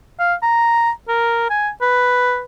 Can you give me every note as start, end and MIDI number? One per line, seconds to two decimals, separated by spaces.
0.19 0.34 77
0.42 0.90 82
1.08 1.48 70
1.50 1.70 80
1.81 2.43 71